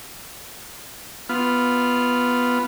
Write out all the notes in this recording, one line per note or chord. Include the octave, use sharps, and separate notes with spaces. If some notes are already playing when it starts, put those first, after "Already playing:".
B3 F4